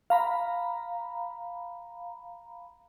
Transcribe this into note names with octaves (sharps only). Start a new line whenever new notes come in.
F5 A#5 B5